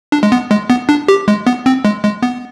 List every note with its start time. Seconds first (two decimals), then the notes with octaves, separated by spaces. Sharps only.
0.12 D4
0.23 G#3
0.32 B3
0.51 G#3
0.70 B3
0.89 D4
1.08 G4
1.28 G#3
1.47 B3
1.66 C4
1.85 G#3
2.04 G#3
2.23 B3